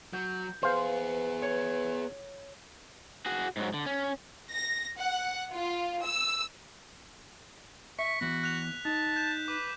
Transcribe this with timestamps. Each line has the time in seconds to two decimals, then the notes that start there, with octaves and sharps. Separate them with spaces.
0.13 F#3 G6
0.63 B3 G#4 B4 C5 F5
1.42 C#5
3.26 F#4 G#4
3.57 G#2 F#3
3.74 D3
3.86 C#4
4.52 A#6
4.99 F#5
5.53 F4
6.04 E6
7.99 E5 C#6 B6
8.21 E3 B3 F#4
8.43 F#6 F7
8.85 D#4 A5
9.16 G6 E7
9.48 B4 D6